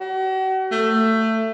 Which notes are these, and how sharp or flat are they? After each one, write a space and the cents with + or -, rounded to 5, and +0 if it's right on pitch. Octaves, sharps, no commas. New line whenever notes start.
F#4 +40
A3 +20